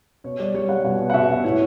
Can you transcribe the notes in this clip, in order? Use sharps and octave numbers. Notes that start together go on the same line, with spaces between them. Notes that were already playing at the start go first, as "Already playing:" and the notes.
B2 C#5
G3 D5
G3 C#5
G3 F#5
B2 F#5
B2
F#5
B2 E5
B2
A2 C#5